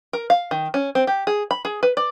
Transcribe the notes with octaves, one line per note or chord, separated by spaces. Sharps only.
A#4
F5
D#3
C#4
C4
G4
G#4
B5
G#4
B4
D5